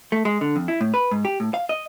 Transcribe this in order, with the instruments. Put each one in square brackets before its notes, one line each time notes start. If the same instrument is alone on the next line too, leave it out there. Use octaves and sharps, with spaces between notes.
[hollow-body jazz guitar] A3
G#3
D3
F2
E4
A2
B4
G#2
G4
A2
F5
D#5